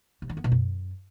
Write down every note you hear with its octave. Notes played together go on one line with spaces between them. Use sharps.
C3
D#3
B3
B2
F#2